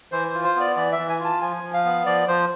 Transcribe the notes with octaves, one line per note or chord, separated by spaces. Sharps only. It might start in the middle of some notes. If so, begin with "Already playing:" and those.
E3 C5
C5
F4
C5
B3 D5
E3 D5
E5
E3
G#5
F4 A5
F3 G#5
F3
F5
B3
F3 D5
F3 C5